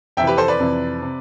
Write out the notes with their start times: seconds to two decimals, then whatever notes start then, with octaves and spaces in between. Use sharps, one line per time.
0.17 F2 C3 E3 E5 G5
0.27 G4 B4
0.37 A4 C5
0.48 B4 D5
0.59 F2 C3 E3
1.02 C3